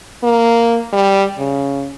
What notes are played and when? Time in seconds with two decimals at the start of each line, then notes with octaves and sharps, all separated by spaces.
0.24 A#3
0.93 G3
1.39 C#3